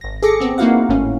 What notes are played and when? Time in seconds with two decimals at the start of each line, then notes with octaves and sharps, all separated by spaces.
0.01 G#1 A#6
0.23 G#4 A4 D6 A#6 C#7
0.40 B3 C4
0.58 A#3 D#4 E4 F#4 F5 F#5
0.89 G#1 A2 C#4